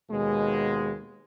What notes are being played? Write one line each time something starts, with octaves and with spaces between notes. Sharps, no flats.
D#2 B2 G#3